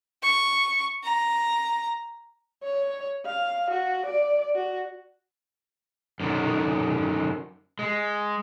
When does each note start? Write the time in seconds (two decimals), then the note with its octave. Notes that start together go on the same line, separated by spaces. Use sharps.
0.22 C#6
1.04 A#5
2.64 C#5
3.26 F5
3.71 F#4
4.06 D5
4.55 F#4
6.20 F#2 D3 D#3
7.79 G#3